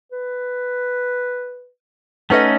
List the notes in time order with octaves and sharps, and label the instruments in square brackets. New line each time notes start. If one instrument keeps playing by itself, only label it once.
[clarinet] B4
[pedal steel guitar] A3 C#4 [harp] D#4 C#5 D#5 [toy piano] A4 B4 F#5